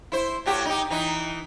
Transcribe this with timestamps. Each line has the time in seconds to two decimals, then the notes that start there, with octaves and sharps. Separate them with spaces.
0.12 E4 C5
0.46 A2 F#4 G4
0.65 D#4 G4
0.90 E3 D#4